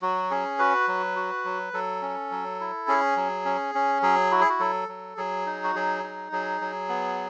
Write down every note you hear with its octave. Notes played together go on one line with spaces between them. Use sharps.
F#3 F#4
C#4 G#4
F#4 B4
F#3
F#4
F#3
F#3 A4
C#4
F#3
E4
C#4 G#4
F#3
C#4
C#4
F#3 G#4
E4 F#4
G#4
F#4
F#3 A4
F#3
F#3 G#4
D#4
F#4
F#3 G#4
D#4
F#3 G#4
F#3
B3